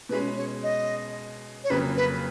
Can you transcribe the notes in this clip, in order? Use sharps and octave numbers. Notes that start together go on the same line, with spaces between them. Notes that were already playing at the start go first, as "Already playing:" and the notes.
B2 G#3 C#4 B4
C#5
D#5
C#5
F2 C#3 F#3 A#3 B4
B4